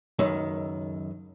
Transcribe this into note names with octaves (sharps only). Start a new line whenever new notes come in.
C#2 F#2 D#3